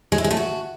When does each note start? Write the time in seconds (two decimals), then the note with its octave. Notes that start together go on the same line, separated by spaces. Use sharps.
0.12 G#3
0.18 E4
0.24 G#3
0.31 A3
0.37 F#4